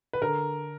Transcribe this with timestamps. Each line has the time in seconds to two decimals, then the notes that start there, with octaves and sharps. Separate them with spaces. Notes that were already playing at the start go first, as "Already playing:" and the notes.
0.13 B4
0.21 D3 A#4